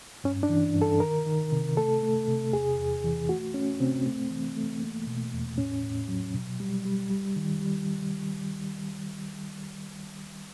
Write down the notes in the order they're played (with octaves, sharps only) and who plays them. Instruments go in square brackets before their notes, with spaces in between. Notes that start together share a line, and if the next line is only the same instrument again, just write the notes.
[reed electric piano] G2 C#4
D4
E3
G2
A4
D#3 A#4
D#3
C3
A3 A4
A3
C3
E2 G#4
E2
E3
A3 F#4
A3 C#4
C3 C4
A3
E3
A3
A#3
B2
E2
A2 C#4
A2
F#3
B2
G3
G3
G3
D#3
G3